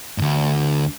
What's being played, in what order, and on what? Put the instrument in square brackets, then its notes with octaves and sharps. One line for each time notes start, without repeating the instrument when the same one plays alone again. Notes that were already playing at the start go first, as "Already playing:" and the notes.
[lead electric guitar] D2 G#2